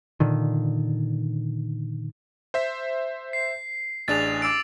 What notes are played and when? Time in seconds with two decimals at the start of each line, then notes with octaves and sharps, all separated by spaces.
0.20 A#2 D3 D#3
2.54 C5 E5 B6
3.33 C7
4.08 A1 D4 G#4 A6 F7
4.42 D6 E6 D7